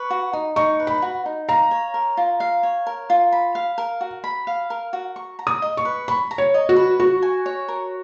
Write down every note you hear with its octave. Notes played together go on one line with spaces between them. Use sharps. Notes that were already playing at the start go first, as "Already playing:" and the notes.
Already playing: B4 C#6
F#4
D#4
D#4 C#6
B4
B5
F#4
D#4
F5 A#5
C#5
A#4
F4
F5
C#5
A#4
F4
B5
F5
A#4
F#4
B5
F5
A#4
F#4
C#6
A#5
D#6
D#5
C#6
B4
B5 C#6
A#5
C#5
D#5
F#4
B4
F#4 C#6
G#5
C#5
A#4